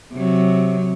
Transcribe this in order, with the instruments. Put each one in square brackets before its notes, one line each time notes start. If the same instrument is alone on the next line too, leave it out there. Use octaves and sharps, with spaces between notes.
[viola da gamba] C3 F#3